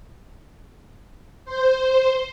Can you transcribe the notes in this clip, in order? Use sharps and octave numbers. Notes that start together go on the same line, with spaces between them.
C5